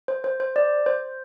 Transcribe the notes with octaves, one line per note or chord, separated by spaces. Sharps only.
C5
C5
C5
D5
C5